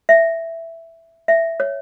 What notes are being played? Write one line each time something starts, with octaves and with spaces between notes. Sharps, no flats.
E5
E5
C#5